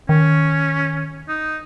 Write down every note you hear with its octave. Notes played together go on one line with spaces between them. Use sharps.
D#3 C#4
D#4